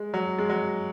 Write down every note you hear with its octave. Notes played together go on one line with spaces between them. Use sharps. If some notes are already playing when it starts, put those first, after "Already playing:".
Already playing: G#3
F#3
G#3
F#3